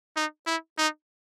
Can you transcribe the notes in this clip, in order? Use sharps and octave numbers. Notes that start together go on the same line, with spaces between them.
D#4
E4
D#4